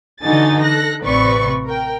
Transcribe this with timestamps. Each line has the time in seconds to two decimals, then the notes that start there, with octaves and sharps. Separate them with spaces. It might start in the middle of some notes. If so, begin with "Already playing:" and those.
0.21 D3 E3 D#4 F#4 G#5 A6
0.62 A4 F#6 A#6
1.04 A1 C3 C4 B4 D5 C#6
1.65 A#4 G5